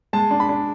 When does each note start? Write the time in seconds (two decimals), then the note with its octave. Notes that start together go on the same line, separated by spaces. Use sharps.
0.13 G#3 A5
0.31 D4
0.40 B5
0.49 D4